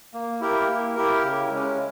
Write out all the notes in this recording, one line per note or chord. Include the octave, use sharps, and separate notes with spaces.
A#3
E4 G4 A#4
A#3
E4 G4 A#4
C#3
G#3 C#4